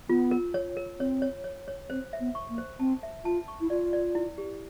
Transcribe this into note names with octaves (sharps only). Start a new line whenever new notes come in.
B3 F4
A#4
C#5
A#4
C4 C#5
C#5
C#5
C#5
C4 C5
E5
B3
C#6
A#3
C5
C4 A5
E5
F4 A5
C#6
E4
F4 D5
D5
E4
G4